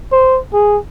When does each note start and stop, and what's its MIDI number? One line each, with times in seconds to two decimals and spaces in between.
0.12 0.39 72
0.53 0.77 68